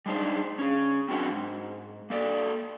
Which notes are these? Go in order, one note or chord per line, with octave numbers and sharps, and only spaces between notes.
G3 G#3 D4 D#4 C5
C#4 G#4
C4 D4 F#4 A#4 F#5
E2 G#2
A#3 A4 D5